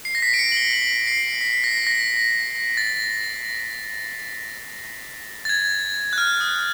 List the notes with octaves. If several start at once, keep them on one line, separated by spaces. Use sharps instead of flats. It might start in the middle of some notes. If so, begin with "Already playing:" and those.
C7
A#6
B6
D7
C#7
F#7
G7
F#7
C7
B6
B6
A#6
A#6
A6
A6
G#6
F#6
F6
D#6